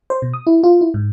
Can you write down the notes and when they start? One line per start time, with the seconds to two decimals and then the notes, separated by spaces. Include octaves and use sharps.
0.10 C5
0.22 B2
0.34 D#6
0.47 E4
0.63 F4
0.81 E4
0.94 G#2